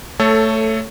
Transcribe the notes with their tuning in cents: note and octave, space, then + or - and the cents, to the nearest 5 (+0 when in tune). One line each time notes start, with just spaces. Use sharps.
A3 +15 A4 +0 C#5 +0